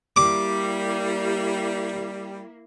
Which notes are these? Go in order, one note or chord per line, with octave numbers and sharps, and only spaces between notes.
G3 A#3 E4 D6